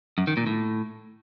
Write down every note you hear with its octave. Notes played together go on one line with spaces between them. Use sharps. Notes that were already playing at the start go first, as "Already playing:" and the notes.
F#2
D#3
A#2
A2